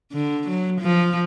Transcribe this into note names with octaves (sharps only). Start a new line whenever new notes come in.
D3
F#3
F3